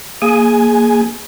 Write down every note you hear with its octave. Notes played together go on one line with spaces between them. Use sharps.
A#3 G#4 G#5